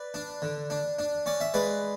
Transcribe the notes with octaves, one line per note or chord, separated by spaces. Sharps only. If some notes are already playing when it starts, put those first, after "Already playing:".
Already playing: B4 D5
D4
D3
D4
D4
C#4 D5
E5
G#3 B4 D5